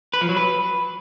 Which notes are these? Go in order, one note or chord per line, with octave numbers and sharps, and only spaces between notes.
B4
F3
F#3
B4